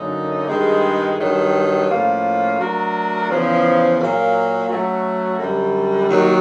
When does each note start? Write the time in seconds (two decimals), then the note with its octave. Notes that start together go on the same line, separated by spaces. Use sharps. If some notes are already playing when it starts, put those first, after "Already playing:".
Already playing: F#2 D3 F#3 A#3 D#4
0.48 G2 D#3 G#3
1.19 G2 D#3 F#3
1.89 A2 F3 A#3 C#4 F4
2.58 F#3 A3 D4 F#4 A#4
3.29 E2 C#3 F3
3.98 A#2 F#3 A#3
4.68 F#3 A3 C#4 F#4
5.38 F#2 D3 G3
6.09 D#2 D#3 F#3